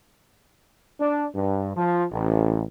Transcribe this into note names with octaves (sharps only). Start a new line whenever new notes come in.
D4
G2
F3
A1